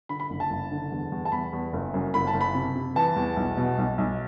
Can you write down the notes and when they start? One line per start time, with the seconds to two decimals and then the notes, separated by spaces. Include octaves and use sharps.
0.09 D3 B5
0.20 B5
0.30 F#1
0.40 A5
0.50 F#1
0.71 D3
0.92 E2
1.12 E2
1.25 A5
1.32 E2 B5
1.53 E2
1.73 F#1
1.94 F#2
2.14 F#1 B5
2.27 A5
2.34 F#1
2.41 B5
2.55 C3
2.75 C3
2.95 E3 A5
3.16 E2
3.37 B1
3.57 B2
3.78 B1
3.98 B1